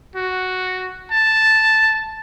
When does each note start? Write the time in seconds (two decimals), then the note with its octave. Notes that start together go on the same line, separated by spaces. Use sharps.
0.16 F#4
1.12 A5